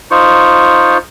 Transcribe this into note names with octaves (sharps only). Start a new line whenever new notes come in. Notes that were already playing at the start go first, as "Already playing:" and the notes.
D#4 F4 C5 C#6